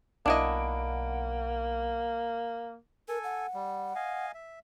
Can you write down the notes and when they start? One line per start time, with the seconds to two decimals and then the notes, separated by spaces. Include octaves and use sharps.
0.26 B1 A#3 D4 E4 D#5 F#5 D7
3.09 A4 A#4 G#5
3.24 F#5
3.54 G3
3.95 D#5 F5 G#5
4.34 E5